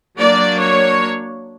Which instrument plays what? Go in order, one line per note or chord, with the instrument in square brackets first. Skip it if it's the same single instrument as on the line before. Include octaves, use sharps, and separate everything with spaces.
[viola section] F#3 A#3 D4 D5
C#5